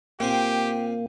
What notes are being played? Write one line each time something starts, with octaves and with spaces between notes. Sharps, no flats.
A#2 A#3 C4 G4 G5 G#5